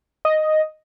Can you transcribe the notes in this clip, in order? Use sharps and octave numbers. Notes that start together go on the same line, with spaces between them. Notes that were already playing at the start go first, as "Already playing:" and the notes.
D#5